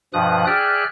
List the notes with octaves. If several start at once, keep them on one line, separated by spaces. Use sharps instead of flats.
G2 B2 F3 D#6 F#6
G#4 D5 E5 G5 F6 F#6